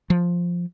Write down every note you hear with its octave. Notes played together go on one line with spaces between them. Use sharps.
F3